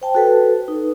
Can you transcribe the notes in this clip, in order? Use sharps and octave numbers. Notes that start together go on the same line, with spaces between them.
C5 G5 A5
F#4 A4 B4
D#4 B4